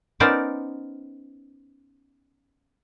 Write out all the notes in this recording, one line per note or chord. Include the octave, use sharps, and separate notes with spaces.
B3 C#4 D#4 A#4 C5 D5